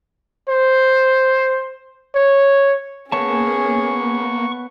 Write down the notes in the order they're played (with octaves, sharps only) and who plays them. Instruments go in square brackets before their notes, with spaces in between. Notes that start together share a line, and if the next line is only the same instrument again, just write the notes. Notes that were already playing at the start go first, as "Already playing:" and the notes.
[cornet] C5
C#5
[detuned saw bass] A#3 [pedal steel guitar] B3 C#5 A5 [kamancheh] C#4 G#4 [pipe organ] C#6